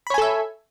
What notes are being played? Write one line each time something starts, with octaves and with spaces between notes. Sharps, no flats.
A4 C#5 E5 G#5 B5